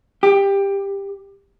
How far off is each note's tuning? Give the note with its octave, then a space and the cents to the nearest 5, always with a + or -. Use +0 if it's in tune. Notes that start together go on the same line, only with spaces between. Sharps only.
G4 +15